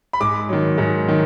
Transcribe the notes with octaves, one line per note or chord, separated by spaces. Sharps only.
B5
G#2 D6
D#3 F#3
G#2
D#3 F#3